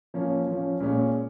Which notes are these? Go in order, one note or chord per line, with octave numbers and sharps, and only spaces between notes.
F3 A#3 C#4
F3 C#4
A#2 G#3 C#4